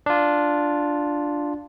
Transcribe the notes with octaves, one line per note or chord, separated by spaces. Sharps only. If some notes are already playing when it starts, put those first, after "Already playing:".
D4 F4